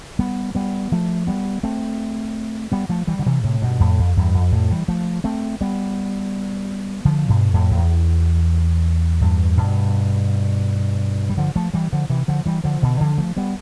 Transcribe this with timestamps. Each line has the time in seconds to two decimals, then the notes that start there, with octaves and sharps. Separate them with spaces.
0.19 G3 B3
0.55 G3 B3
0.92 F3 A3
1.27 G3 B3
1.63 A3 C4
2.72 G3 B3
2.89 F3 A3
3.07 E3 G3
3.19 D3
3.26 C3 E3
3.44 A2 C3
3.62 G2 B2
3.80 F2 A2
3.99 F2
4.17 E2 G2
4.35 F2
4.52 F2 A2
4.71 E3 G3
4.88 F3 A3
5.24 A3 C4
5.61 G3 B3
7.05 D3 F3
7.28 G2 B2
7.54 F2 A2
7.71 F2
7.77 E2
9.21 E2 G2
9.57 G2 B2
11.30 G3
11.37 D3 F3
11.56 F3 A3
11.74 E3 G3
11.93 D3 F3
12.10 C3 E3
12.28 D3 F3
12.46 E3 G3
12.64 D3 F3
12.82 B2 D3
13.00 D3 F3
13.18 F3 A3
13.37 G3 B3